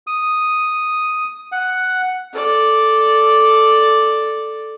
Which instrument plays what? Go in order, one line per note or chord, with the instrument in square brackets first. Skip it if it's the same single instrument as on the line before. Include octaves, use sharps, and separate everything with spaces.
[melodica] D#6
F#5
[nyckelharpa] A4 D5